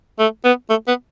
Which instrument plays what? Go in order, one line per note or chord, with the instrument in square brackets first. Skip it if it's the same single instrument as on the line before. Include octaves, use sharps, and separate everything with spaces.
[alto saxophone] A3
B3
A3
B3